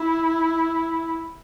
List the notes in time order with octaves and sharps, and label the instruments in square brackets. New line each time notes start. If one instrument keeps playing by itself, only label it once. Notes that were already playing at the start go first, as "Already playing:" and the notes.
Already playing: [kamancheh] E4